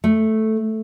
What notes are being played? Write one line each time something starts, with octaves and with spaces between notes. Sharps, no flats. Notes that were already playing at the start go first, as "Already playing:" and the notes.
A3